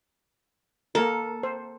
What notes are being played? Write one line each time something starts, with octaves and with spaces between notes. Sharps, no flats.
A#3 A4 A#4
C5